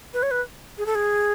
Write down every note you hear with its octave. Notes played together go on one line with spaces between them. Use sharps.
B4
C#5
B4
G#4
A4
G#4